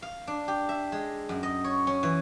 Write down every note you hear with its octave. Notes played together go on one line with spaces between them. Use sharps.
F5
D4
G4
E5
G#3
F#2
D#5
C#5
C#4
E3